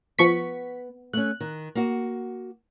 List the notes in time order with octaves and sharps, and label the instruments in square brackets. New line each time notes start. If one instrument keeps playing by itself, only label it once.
[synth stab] F3 C#6 B6 [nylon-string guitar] B3
[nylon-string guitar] A3 C#4 [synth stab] F#6
[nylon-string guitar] D#3
A#3 F#4